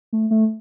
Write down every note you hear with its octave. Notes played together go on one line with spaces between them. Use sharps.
A3
A3